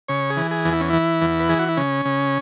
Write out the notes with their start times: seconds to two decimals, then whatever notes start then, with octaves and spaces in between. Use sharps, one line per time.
0.08 C#3 C#5
0.30 G#4
0.37 E3
0.51 G#4
0.65 E2
0.73 E4
0.80 C#4
0.90 E3 E4
1.21 E2
1.40 B4
1.49 E3 G#4
1.59 F#4
1.69 E4
1.77 C#3 C#4
2.05 C#3